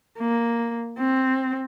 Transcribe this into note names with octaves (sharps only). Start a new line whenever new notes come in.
A#3
C4